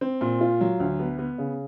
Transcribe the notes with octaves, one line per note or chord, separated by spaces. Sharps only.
C4
A#2
F4
F#3
D2
B3
B3
C#3